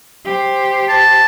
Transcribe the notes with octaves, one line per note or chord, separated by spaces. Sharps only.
G4 C5
A5